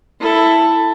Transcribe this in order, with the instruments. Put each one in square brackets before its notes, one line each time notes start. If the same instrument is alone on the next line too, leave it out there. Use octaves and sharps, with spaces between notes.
[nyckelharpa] E4 A4